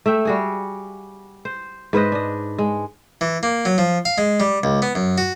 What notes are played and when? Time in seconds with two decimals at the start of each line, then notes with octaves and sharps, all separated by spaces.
0.06 A3 E5 G5
0.25 G3 F#4 G#4
1.45 C5
1.93 G#2 B4 C5 D#5
2.12 D4 D#5
2.58 G#3
3.21 E3
3.43 A#3
3.65 F#3
3.78 F3
4.05 F5
4.18 G#3
4.40 G3
4.63 C#2
4.82 B3
4.95 F#2
5.18 F#4